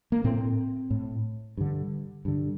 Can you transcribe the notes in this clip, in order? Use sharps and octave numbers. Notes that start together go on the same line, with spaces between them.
A#3
A2 C4
A2
G2 D3
G2 D3